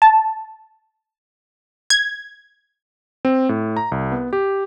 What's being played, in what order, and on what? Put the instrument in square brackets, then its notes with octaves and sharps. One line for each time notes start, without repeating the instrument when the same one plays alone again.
[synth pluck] A5
G#6
[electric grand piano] C4
A2
A#5
C2
B3
G4